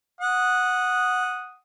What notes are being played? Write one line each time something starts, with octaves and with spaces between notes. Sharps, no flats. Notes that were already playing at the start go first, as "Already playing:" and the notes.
F#5 D#6